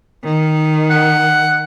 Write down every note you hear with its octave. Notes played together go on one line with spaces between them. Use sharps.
D#3
F#5